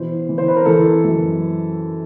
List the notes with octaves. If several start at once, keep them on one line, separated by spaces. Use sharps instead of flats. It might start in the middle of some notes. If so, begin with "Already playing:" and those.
Already playing: B2 E3 C5
E3
C5
B4
A#4
E3 A4
F#2